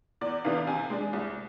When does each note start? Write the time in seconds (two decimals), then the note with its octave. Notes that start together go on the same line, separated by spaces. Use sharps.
0.21 E2 D5
0.45 C3 E3 B3 D4 F5
0.67 C3 G#5
0.90 G#3 D4
1.13 C2